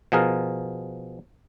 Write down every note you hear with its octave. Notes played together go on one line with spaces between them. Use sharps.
B2 F3 G#4 A#4